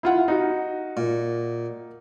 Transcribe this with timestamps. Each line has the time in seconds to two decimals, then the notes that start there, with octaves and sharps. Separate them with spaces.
0.03 E4 F4 F#5
0.28 D#4 F#4
0.97 A#2